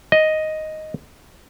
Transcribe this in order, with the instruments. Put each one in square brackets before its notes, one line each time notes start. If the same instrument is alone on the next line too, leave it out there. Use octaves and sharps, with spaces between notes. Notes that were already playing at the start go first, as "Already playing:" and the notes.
[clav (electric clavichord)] D#5